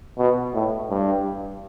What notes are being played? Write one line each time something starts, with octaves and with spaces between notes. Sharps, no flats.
B2
A2
G2